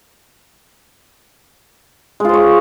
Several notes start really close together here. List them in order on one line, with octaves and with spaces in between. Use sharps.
G#3 F4 C5 C#5